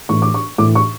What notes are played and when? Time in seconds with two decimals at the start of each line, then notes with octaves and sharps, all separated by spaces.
0.09 A2 E3 C#6
0.22 D6
0.34 C#6
0.58 A2 E3 D6
0.75 C#6